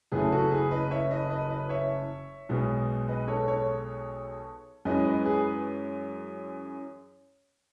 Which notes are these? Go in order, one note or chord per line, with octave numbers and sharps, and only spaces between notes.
F#1 F#2 E3 A3 G#4 B4
F#4 A4
G#4 B4
B4 D#5
C#5 E5
B4 D#5
B4 D#5
B4 D#5
C#5 E5
B1 B2 G#3 B3
B4 D#5
A4 C#5
A4 C#5
F#2 E3 G#3 C#4 B4 D#5
B4 D#5
G#4 B4
B4